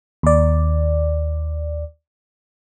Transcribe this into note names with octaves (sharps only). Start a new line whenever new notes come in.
D#2 D5